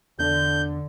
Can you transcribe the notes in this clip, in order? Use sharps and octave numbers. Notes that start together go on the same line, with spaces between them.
E2 D3 D4 G6